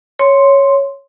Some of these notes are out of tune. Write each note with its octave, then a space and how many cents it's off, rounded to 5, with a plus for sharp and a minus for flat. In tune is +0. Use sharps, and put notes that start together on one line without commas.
C#5 +0 C6 +0